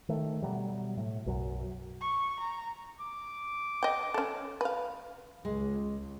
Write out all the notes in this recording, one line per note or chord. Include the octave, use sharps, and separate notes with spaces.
D#3 A3
B2 F#3 G3
A2
B1 F#2 F#3
C#6
A#5
D6
D#5 G5
C#4 A4
B4 F5
C#2 G#3